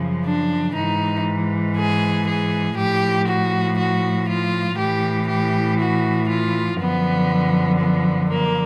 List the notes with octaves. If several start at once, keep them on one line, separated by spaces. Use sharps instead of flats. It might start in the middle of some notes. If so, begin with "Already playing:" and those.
Already playing: F#2 C#3 F3
D4
G#2 E3 D#4
G#4
G#4
A2 F3 G4
F#4
F#4
F4
A2 E3 G4
G4
F#4
F4
F#2 D3 F3 B3
B3
A#3